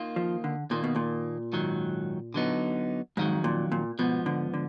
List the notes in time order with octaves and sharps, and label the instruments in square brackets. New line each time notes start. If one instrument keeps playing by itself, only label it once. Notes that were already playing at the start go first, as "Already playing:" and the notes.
Already playing: [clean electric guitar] D#2 D#3 A#3 F4
[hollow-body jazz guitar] F3
D3
[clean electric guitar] D#2 D#3 A#3 [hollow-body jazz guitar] A#2
[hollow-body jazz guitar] B2
A#2
[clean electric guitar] G#2 D#3 F#3
D3 F#3 B3 D#4
[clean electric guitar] F2 D#3 F#3 [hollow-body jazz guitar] G#2
[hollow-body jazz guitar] A#2
A#2
[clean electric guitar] G#2 F3 B3 [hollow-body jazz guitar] B2
[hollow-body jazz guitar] D3
D3